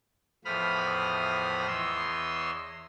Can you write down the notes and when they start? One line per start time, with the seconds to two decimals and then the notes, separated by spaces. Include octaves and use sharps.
0.45 E2 A2 F3 B5 D#6 F6
1.67 E2 C#5 D#5 C6 E6